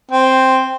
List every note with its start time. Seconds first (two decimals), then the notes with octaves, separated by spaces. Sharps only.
0.11 C4